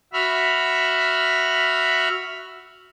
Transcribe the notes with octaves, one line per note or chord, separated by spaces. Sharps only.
F#4 E5 B5 F6